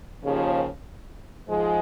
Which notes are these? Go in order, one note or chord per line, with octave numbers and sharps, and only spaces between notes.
D#2 C#3 F3
G#2 F3 G#3